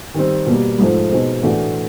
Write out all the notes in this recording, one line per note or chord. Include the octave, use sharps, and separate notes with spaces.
D#3 G3 C4
B2 G3 A#3
G#2 F3 A3
B2 G#3 C4 D#4
A2 E3 A3 D4 F#4